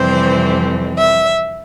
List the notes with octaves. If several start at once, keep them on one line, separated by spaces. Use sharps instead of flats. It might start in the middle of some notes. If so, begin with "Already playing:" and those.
Already playing: F2 C3 E3 G3 C4 C5
E5